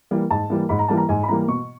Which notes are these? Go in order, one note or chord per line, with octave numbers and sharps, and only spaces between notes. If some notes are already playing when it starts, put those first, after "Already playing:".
E3 G3 A#3
G#2 A5
E3 G3 A#3
G#2 B5
A#5
E3 G3 A#3 A5
A#5
G#2 G#5
B5
E3 G3 A#3 A#5
B2 C#6